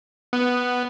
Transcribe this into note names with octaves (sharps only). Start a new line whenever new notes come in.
B3